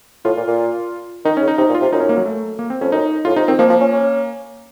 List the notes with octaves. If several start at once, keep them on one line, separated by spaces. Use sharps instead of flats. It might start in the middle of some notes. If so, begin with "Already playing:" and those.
A2 F4
A#2
A#2
D#3 D#4
C#4
C#3
D#4
C3 D#4
A#2
F4
C3
F#2 D#4
C#4
A#3
F#3
A3
A#3
C4
F2 C#4
F#2 D#4
A2 F4
C3 D#4
D#3 C4
F3 A#3
F3
C#4
C#4